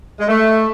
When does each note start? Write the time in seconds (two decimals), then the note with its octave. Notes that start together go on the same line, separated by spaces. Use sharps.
0.20 G#3
0.28 A3